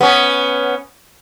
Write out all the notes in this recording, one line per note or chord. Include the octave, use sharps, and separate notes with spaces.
B3 C#4